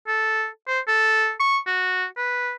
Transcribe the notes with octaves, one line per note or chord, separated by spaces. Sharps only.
A4
C5
A4
C#6
F#4
B4